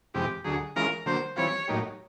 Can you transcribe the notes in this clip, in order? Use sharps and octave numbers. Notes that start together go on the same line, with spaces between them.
F2 C3 E3 G#3 G4
D2 D3 F#3 G#4
E3 G#3 C#4 F4 A#4
D3 F#3 A#3 C5
E3 G3 C4 F4 C#5
A2 F#3 A#3 D#4 G4